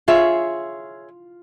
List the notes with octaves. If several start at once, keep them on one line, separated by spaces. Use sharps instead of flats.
F4 G#4 C#5 E5